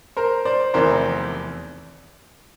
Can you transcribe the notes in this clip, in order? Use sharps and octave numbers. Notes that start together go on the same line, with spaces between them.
A#4 C5
C5 D5
F1 E2 C3 D#3 A#4 C5